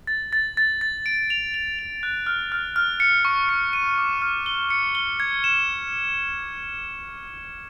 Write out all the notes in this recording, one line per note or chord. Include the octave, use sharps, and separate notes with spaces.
A6
A6
A6
A6
D7
F7
F7
F7
F#6
F6
F6
F6
C#7
C#6
C#7
D#7
D6
F6
G7
C#7
G7
G#6
E7